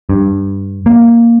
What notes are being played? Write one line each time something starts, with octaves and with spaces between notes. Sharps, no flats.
G2
A#3